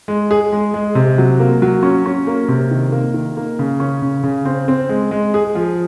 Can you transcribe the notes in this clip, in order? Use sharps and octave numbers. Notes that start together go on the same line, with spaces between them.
G#3
G#4
G#3
G#3
C3
F#3
A#3
F#3
C#4
C#4
A#3
C3
D#3
A#3
D#3
A#3
C#3
C#4
C#3
C#3
C4
C4
G#3
G#3
G#4
F3